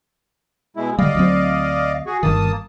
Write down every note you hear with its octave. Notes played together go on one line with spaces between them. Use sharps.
B2 G#3 E4
D3 G3 D5 D#5 F5
D2 F#3 C4
F#4 G#4
G1 G2 D#3 A#3 A5 D#6